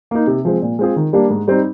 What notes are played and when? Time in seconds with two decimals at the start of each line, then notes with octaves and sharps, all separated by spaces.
0.11 A#3 D#4
0.27 C3
0.45 F3 G#3 C4
0.62 A#2
0.79 G#3 C4 F4 G#4
0.96 D#3
1.13 G3 A#3 D4 G4
1.30 G#2
1.48 G3 C4 D#4